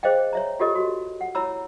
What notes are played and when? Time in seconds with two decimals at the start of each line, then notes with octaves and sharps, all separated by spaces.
0.03 G#4 C5 D#5 F5 G5
0.33 C#5 E5 A#5
0.60 F4 G4 A4 D#5
0.75 F#4
1.21 F#5
1.35 E4 C#5 A#5 B5 E6